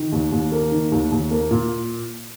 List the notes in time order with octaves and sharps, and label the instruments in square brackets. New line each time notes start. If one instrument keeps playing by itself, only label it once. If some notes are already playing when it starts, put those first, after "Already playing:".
Already playing: [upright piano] D#3
D#2
D#2
A#3
D#3
D#2
D#2
A#3
A#2